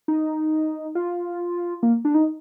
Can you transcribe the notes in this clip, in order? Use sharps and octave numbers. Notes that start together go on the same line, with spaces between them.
D#4
F4
A#3
D4
D#4